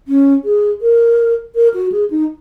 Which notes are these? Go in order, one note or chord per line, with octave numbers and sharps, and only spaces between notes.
C#4
G#4
A#4
A#4
F#4
G#4
D#4